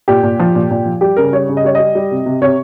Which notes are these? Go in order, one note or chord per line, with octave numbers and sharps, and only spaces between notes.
A#2 G4
A#2
F3
A#2
A#2
F3
G3 G4
C#3 A#4
G3 C#5
C#3
D#5
G3 C#5
G3 D#5
G3
C3
C3
C3 C#5